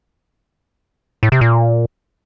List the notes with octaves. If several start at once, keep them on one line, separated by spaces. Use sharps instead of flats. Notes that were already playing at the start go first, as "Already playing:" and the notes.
A2
C3
A#2